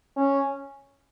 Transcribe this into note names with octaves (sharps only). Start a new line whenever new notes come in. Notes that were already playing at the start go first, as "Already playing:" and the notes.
C#4